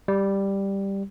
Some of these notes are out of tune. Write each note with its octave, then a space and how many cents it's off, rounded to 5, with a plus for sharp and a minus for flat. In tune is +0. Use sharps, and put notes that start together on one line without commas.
G3 +5